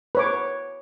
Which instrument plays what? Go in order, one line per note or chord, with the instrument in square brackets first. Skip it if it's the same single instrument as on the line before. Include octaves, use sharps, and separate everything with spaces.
[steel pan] B4 C#5 D6